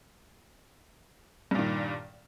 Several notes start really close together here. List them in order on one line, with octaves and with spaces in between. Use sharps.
G2 A#2 D#3